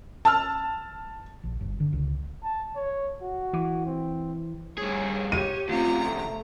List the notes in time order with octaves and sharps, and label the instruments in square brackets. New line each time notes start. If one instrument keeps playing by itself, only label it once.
[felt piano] A5 E6 F6
[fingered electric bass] A#1
G1
D3
C#2
[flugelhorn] A5
C#5
F#4
[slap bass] E3
[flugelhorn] C4
[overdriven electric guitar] G2 G#4 [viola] C#5
[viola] G4 C#5 [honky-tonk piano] D#7
[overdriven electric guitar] D2 C3 [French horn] F4 [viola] A#5
[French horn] A3